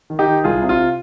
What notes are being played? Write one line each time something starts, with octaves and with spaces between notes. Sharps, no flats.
D#3
D#4 G4
D#3
C2 F4 G#4
C3
F4